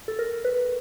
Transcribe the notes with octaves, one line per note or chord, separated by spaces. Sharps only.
A4
A#4
B4